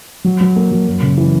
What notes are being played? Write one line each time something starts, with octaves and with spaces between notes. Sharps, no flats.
F#3
F#3
A#3
F#3
F#2
C#3
E3